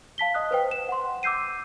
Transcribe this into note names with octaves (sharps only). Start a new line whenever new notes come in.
F5 A5 B6 G7
D#5 D#6 F#6
B4 C5 G5
E7
F#5 C6
D6 E6 G6 C7 D#7